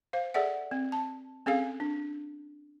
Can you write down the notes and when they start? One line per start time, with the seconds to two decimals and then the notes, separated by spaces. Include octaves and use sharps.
0.13 C5 F5
0.34 G#4 A4 D5 E5 F#5
0.71 C4
0.92 A5
1.46 C4 C#4 G#4 A4 F5
1.80 D4